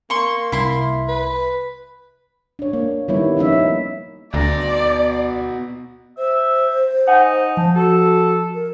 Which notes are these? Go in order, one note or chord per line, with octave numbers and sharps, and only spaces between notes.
A#3 C6 C#6
C2 E4 C6
B4
D4 C#5
A#3
D#3 G3 A#3 B3 E4 C#5
F3 A#3 C#4 D#4 C#5 E5
D#4 A#4
D2 B2 D5 A#5
C5 E5
D#4 F#5 G#5
F3 A5
F#4 A4
A#4